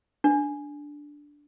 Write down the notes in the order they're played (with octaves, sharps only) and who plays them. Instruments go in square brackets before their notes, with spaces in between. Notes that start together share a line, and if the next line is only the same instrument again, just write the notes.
[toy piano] D4